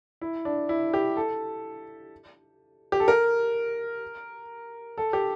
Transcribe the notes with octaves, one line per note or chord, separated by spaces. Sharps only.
E4
D4
E4
G4
A4
G4
A4
A#4
A4
G4